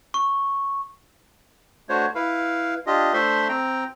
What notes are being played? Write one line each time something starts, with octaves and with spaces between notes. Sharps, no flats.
C#6
A3 D4 F#4 C5 C#5
E4 B4 F5
D4 F4 G4 D#5
A3 D4 A4 C5 E5 C6
C4 G5 A#5